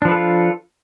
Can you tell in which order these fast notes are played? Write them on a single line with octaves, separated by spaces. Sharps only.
D4 F3 B4 A4 F4